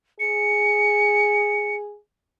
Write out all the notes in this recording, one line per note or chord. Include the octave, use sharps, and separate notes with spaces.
G#4 C#7